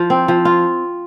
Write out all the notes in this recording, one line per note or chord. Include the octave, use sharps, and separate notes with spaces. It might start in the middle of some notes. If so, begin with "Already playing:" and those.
Already playing: F3 F4
C4
F3
F4